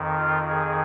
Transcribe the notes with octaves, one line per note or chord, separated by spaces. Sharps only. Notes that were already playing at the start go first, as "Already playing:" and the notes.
Already playing: F2 D#3
F4
G#4